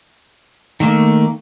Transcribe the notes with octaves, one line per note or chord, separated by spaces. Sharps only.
D#3 A3 A#3